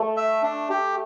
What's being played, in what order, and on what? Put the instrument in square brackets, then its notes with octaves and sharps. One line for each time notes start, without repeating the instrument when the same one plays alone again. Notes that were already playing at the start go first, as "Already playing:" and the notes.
Already playing: [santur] A3
[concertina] E5
D4
G4